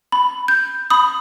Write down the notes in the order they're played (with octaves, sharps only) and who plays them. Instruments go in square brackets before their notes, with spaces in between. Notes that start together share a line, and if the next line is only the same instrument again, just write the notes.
[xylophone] B5
G6
B5 D#6